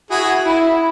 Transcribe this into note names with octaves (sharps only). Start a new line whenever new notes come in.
E4 F#4 G#4
E4